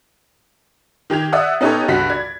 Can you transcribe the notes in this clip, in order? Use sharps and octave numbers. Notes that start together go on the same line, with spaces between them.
D#3 G4 G#6 F7
D5 E5 F#5 D#6
B3 C#4 D#4 G4 A4 C#5
C#2 G2 F#4 B6
D5 G#6